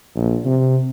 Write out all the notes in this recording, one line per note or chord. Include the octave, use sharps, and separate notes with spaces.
A#1
C3